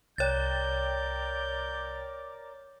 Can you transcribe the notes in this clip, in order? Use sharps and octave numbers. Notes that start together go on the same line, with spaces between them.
C2 A#4 C#5 D5 G5 D6 G6 A6